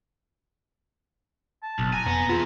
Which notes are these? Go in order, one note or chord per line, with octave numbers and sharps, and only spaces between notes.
A5
F#1 B1
G#5 A#5
F2 B3
B3 F4 G#4